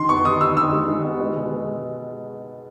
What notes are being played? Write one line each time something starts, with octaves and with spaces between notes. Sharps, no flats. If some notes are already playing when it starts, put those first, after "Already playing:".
Already playing: D#3 C6
B3 C#6
D#3 D#6
D#3 E6
D#3 E6
G#3
D#3
B3
G#3
B2
G#3